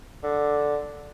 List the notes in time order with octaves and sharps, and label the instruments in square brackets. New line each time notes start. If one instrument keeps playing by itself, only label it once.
[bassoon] D3